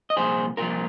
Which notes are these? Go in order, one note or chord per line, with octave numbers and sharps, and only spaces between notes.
D#5
C2 A#2 F3 G#4 C5
C2 A#2 F3 F4 A#4